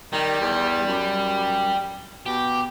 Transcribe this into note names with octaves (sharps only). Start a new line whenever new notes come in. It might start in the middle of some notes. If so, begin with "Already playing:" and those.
D#3 G3
E2
F#2
B2 G4